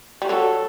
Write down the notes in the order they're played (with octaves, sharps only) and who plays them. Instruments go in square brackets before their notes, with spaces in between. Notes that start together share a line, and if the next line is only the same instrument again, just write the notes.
[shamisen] G3
[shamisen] F#3 [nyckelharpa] A4